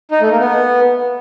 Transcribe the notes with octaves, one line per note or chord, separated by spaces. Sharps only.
D#4
A3
A#3
B3